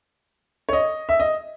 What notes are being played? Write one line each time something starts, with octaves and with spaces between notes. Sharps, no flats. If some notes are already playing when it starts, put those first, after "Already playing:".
C#5
D#5
E5
D#5